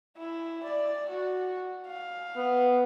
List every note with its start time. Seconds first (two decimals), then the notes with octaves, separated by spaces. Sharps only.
0.17 E4
0.63 D5
1.09 F#4
1.86 F5
2.36 B3